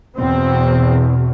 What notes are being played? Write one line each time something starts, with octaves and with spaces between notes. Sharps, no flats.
E2 B2 C4